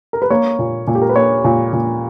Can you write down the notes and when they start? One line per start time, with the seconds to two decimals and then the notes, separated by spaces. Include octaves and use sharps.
0.13 A#4
0.22 B4
0.30 A#3 C#5
0.59 A#2
0.87 A#2
0.95 G4
1.02 A#4
1.09 B4
1.16 A#3 C#5
1.44 A#2
1.73 A#2